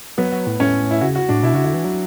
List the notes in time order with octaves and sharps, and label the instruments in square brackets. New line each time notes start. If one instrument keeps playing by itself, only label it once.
[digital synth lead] F#3 [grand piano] B3
[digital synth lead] F#3
A2
[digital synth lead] A2 [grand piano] C#4
[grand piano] E4
[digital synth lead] C#3 [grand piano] F#4
[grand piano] F#4
[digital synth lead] A2 [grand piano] D4
[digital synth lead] B2 [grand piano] E4
[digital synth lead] C#3 [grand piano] F#4
[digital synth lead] D3 [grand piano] E4
[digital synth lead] E3
F#3